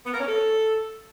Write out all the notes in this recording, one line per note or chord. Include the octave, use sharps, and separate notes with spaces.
B3
A#4
C#4
A4